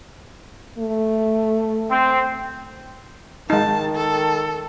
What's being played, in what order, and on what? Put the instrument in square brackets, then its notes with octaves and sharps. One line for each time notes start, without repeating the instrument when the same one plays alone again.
[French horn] A3
[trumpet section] C4
[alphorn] D#3 [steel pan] G#3 D#4 [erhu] A5
[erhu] A4